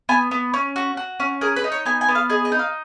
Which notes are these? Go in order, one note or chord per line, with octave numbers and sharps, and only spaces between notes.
B3 G#5
B3
C#4
F#4
F#4
C#4
G#4 A#4
B4
D#4
C#5
B3 G#5
G#5
B3
F5
G#4 D#5
D#5
D#4
F5